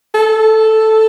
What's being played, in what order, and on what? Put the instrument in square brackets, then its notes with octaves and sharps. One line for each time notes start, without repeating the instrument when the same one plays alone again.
[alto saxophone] A4